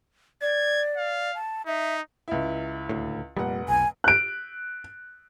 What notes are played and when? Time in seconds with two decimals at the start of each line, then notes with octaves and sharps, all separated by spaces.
0.42 D5 G#6
0.96 F5
1.34 A5
1.66 D#4 E5
2.28 C#2 E4
2.89 D2 A2
3.37 F1 A#2 G3 F#5
3.69 B1 G#5
4.04 F#6 D7